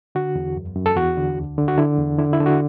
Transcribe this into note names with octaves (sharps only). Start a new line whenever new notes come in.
D3 F#4
E2
F#2
F#2
A4
E2 F#4
D3
D2
D3
F#4
D3 E4
E2
D3 E4
E4
D3
F#4